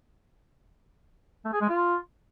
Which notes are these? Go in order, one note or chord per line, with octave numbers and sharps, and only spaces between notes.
A3
G#4
G#3
F4